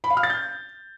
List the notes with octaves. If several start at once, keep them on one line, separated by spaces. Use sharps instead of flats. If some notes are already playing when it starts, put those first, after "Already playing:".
B5
F5
F6
A6
G6